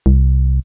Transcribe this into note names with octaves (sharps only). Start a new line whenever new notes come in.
C2